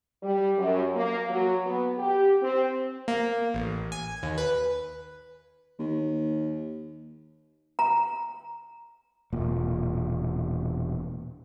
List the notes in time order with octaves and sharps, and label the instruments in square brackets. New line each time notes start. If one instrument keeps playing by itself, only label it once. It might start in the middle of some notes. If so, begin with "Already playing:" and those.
[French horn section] G3
F#2
A#3
F#3
B3
G4
C4
[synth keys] A#3
A1
G#5
D#2
B4
[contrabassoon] D#2
[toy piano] A#5
[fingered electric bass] E1 A#2